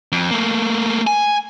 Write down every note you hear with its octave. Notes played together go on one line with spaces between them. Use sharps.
F2
A3 A#3
G#5